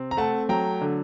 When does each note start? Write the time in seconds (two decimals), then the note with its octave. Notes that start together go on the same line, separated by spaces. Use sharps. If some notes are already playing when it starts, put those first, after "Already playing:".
Already playing: C3 C4
0.11 A#5
0.17 A3 F#5 A5
0.49 F#3 G5 A#5
0.81 D3